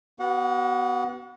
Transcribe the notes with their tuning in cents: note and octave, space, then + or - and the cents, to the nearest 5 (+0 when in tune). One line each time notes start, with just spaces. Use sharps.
B3 +0 F#4 +35 F#5 -30